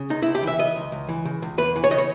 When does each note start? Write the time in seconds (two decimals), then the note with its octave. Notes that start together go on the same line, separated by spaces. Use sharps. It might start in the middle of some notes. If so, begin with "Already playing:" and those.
Already playing: C#3
0.10 C#2 D#4
0.22 C#2 E4
0.35 G4
0.43 E3 E5
0.59 C#3 D#5
0.76 C#2
0.92 C#2
1.09 E3
1.25 C#3
1.42 C#2
1.58 E2 B4
1.76 E3
1.84 C#5
1.91 C#3 D#5
1.98 C#5